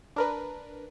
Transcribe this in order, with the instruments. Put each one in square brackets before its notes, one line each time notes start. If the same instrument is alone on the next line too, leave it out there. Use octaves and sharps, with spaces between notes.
[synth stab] D4 A#4 B4